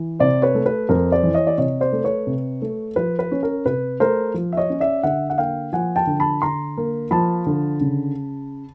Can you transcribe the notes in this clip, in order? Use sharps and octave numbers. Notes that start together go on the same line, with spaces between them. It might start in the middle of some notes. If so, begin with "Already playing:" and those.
Already playing: E3
C3 C5 D5
B4 C#5
A3
B4
F2 A#4 C5
C5 D5
E3
C#5 D#5
D5
C3 C#5 D#5
C5 D5
A3
B4 C#5
C3
A3
F3 B4
B4
C#4
A#4
C3 B4
A3 A#4 C5
F3
E5
C#5 D#5
C#4
D5 E5
D3 E5 F#5
F#5
A#3 F5 G5
F3 F#5 G#5
G5 A5
D3
A5 B5
D3 A#5 C6
A#3
F3 A5 B5
D3
C#3